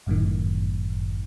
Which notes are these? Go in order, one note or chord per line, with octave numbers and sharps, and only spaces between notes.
G1 F#2 A2 D#3